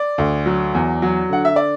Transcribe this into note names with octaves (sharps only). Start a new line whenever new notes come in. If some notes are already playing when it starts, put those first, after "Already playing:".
Already playing: D5
D2
F#3
E2
F#3
D3 F#5
E5
D5